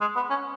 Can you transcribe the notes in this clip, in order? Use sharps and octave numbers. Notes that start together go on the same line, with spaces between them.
G#3
B3
C#4